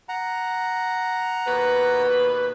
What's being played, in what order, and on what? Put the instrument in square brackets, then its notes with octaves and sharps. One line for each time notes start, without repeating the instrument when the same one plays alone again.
[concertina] F#5 A#5
[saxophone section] D#2 B2 B4